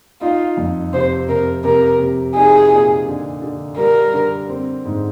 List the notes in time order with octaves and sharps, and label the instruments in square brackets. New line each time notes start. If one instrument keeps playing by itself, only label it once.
[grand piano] D#4 [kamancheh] F4
[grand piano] F2
[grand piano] C3 [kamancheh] C5
[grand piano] C3 [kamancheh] A#4
[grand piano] C3 [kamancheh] A#4
[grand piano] C3
[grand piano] D#4 [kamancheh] G#4
[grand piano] A#2
D3
D3
[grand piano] G3 [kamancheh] A#4
[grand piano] D3
C4
G#2